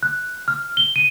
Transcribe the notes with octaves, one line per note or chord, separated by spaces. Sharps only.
F#6
F6
G7
D#7